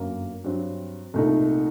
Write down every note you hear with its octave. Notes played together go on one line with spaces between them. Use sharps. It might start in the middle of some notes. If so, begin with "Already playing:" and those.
Already playing: G1 F#2 F#3 A#3
G2 F#3 C4
C2 A#2 A3 D#4